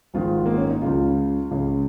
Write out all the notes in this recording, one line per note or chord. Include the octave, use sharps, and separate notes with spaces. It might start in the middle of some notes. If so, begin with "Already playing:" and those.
G#1 G#2 D#3 F4
A#3
C#4
D#4
C#2 C#3 F4
C#2 C#3